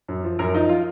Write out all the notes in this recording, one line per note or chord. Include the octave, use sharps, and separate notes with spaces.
F#2
F3
F#2 A#4
F3 D#4
F4